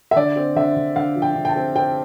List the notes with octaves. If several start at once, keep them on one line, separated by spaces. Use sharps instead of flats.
E5
D3 D5
C4
D3 E5
D3
D3 F5
F3
G5
D3
G5
A5
C4
C4 G5